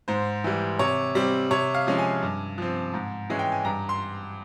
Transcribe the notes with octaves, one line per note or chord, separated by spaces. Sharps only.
G#2 C5
E3 G3
C3 C#5
G3 C4
C3 C#5
F5
F3 G#3 C#4
G#5
G2
F3 C4
G#2
E3 G#3 C#4
G5
G#5
G2 A#5
C6